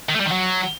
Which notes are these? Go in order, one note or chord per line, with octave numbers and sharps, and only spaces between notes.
D#3
A3
G3
D#3
F#3